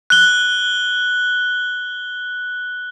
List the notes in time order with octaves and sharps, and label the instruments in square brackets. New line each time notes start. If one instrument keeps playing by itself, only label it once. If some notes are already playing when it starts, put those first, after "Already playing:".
[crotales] F#6 G7